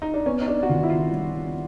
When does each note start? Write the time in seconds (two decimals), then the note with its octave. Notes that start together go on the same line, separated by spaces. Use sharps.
0.02 D#4
0.14 D4
0.26 B3 C#4
0.41 D#4
0.48 D4
0.63 F#4
0.69 D#3 F4
0.83 E4
0.90 F4
1.12 G3